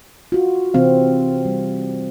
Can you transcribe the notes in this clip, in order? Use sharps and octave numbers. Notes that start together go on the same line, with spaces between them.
F4 F#4
C3 E3 C4 F5
G3